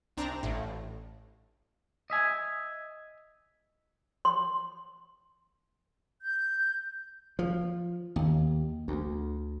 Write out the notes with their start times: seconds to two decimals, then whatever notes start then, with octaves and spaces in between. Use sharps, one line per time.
0.17 C2 C4 D4 A#5
0.43 A1 A2
2.10 D#5 E5 G#5
4.25 C6
6.23 G6
7.39 F3
8.16 D#2
8.88 D2